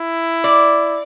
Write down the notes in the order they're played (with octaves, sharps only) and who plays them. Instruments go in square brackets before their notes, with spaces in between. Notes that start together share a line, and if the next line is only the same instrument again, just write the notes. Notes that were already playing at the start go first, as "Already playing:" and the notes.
Already playing: [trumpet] E4
[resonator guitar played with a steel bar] D5